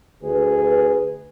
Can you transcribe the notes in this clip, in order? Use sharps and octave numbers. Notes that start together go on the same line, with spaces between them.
D2 G#4 B4